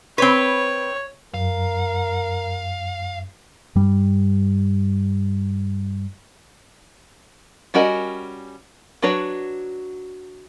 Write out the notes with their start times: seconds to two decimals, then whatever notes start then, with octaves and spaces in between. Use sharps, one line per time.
0.18 C4 B4 C#5
1.34 F#2 A#4 F5
3.75 G2 G3
7.74 G3 C#4 F#4 A#4 D#5
9.02 F#3 D4 F#4 B4 C#5